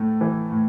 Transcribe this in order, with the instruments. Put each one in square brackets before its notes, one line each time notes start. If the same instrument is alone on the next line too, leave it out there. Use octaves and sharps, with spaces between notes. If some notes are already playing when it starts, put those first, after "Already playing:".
Already playing: [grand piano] A2 A3
E3
A2